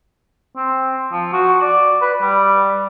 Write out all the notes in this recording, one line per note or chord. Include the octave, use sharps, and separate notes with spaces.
C4
F3
F#4
D5
B4
G3